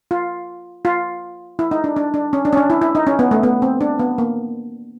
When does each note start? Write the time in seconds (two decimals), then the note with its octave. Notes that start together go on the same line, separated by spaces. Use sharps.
0.11 F4
0.85 F4
1.59 E4
1.71 D#4
1.84 D4
1.96 D4
2.14 D4
2.33 C#4
2.45 D4
2.53 C#4
2.57 D4
2.70 E4
2.82 E4
2.95 D#4
3.07 C#4
3.19 B3
3.31 A3
3.43 B3
3.62 C4
3.81 D4
3.99 B3
4.18 A#3